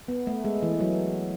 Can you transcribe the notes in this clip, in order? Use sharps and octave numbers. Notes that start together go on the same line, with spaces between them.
B3
A3
G#3
E3
F#3